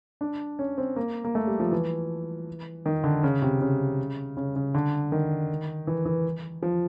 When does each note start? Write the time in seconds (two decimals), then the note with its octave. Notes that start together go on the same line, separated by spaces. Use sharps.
0.21 D4
0.59 C#4
0.78 C4
0.96 A#3
1.24 A#3
1.35 A3
1.47 G3
1.60 F3
1.72 E3
2.86 D#3
3.04 D3
3.23 C#3
3.42 C3
3.61 C#3
4.37 C#3
4.56 C#3
4.74 D3
5.12 D#3
5.87 E3
6.05 E3
6.63 F3